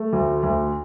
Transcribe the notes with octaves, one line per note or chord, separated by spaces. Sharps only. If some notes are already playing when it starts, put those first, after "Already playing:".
Already playing: A3
D2
D2